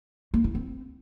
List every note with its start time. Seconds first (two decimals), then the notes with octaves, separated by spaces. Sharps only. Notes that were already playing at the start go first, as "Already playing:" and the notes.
0.34 A#3
0.44 E4
0.55 C4